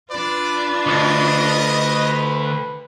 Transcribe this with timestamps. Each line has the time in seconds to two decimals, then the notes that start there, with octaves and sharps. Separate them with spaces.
0.11 D4 F4 B4 D5
0.87 D2 D#5